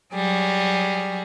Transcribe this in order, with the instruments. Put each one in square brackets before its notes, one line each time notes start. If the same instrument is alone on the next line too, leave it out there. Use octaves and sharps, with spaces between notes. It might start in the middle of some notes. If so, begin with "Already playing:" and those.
[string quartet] F#3 G3 G#4